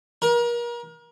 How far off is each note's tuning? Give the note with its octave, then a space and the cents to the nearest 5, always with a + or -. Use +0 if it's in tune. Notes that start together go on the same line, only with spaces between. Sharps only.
A#4 +35